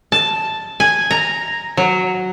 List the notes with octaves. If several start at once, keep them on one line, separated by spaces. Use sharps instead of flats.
A5
G#5
A#5
F#3